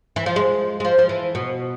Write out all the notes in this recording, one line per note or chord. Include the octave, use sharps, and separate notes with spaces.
E3
F3
G#3
G#3
F3
F3
E3
B2